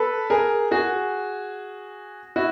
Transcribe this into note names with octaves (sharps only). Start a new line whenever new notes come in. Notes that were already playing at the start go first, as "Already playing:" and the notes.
Already playing: A4 B4
G#4 A#4
F#4 G#4
E4 F#4